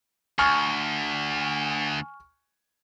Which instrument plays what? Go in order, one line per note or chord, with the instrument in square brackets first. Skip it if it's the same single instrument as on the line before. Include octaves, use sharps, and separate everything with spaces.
[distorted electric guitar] D2 [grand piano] G#5 C#6 F6